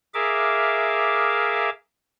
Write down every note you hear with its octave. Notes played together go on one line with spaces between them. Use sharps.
G#4 A#4 E5 F5 D6